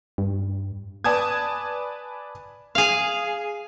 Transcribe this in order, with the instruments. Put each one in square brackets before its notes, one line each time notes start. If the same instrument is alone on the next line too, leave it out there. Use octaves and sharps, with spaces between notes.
[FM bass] G2
[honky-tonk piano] B4 D5 G#5 A5 D#6 G#6
[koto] G#4 F5